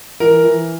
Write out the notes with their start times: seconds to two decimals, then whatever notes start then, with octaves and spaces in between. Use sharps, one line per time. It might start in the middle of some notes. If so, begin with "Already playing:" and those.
0.20 E3 A#4
0.44 E3